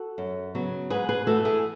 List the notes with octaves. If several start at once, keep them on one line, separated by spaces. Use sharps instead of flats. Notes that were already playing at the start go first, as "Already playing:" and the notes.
Already playing: F#4 A4
F#2
C#3 F#3 B3
G#2 G#4 B4
G#4 B4
E3 A3 F#4 A4
E4 G#4